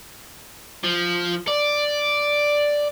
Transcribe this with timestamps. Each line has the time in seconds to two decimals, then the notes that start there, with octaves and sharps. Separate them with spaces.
0.84 F3
1.48 D5